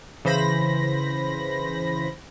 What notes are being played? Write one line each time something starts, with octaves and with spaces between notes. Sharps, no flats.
C#3 E3 C5 B5 A#6